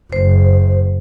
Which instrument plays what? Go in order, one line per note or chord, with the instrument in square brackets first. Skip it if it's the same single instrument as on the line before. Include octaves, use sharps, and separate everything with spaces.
[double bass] F#1 [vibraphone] C5